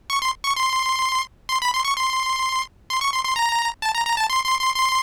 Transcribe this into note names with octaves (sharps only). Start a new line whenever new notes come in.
C#6
C6
C#6
C6
C6
B5
C6
C#6
C6
C6
C#6
C6
C6
A#5
A5
A#5
A#5
A5
C6
C6
C6
C6